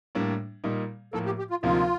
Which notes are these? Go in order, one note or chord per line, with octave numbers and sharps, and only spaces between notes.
A2 G3 A#3 D4
A#2 G3 A#3 D#4
A2 F3 A#3 A4
G4
G4
F4
D2 C3 F3 A#3 D#4 F4